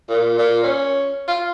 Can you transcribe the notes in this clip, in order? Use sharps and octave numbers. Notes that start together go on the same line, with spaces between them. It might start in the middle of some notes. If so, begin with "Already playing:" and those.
A#2
A#2
C#4
F4